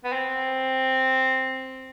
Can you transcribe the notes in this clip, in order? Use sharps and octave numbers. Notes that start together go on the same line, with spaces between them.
B3
C4